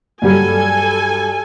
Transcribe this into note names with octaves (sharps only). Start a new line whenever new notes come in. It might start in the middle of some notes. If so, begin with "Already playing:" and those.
G2 F#3 G3 A4 G#5